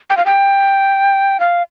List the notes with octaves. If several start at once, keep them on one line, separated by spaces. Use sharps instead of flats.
G5
F5
G5
F5